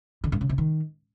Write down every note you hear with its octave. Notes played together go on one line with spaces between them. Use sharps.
D3
G2
C#3
C3
D#3